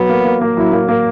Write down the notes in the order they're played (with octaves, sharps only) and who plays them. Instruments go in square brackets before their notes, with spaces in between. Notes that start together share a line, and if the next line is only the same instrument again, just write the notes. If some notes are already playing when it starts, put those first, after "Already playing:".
Already playing: [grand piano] F#3 [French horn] B3
[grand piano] A#3
A#3
A#3
[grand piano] F#3 [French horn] E4
[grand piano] A#3
A#3